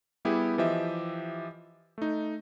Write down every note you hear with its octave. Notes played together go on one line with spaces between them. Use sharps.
G3 B3 E4 G4 G#4
E3 F3 G4 D#5 E5
A3 D#4